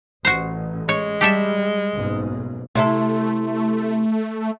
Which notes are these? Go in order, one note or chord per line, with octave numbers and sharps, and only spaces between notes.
A1 F#4 C5
G#3 C#5
G3 G4 A4 E5
F#1 B1 G#2
C3 A3 E4 A4